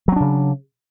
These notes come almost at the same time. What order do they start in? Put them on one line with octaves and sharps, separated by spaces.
F#3 C4 D4 C#3